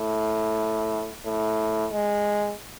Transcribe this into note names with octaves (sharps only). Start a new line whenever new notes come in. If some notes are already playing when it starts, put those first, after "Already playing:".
Already playing: A2
A2
G#3